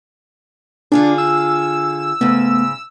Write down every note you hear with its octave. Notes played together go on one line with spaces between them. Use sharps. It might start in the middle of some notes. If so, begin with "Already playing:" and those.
D3 D4 F4 G#4
E6
G#2 C#3 A3 B3